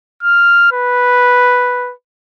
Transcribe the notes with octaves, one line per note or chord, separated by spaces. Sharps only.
F6
B4